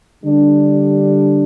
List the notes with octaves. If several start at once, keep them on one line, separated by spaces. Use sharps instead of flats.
D3 G3 D4